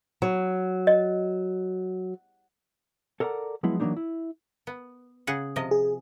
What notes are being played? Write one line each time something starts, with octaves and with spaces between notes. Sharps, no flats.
F#3
D#5
A4 A#4 D5 E5 F#5 A#5
F3 F#3 G#3 B3 E4
E3 F#3 A3 A#3 D4 D#4
E4
B3
C#3 G#4 F#5
C3 F3 D#5
G#4